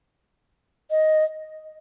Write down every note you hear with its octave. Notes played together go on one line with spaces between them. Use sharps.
D#5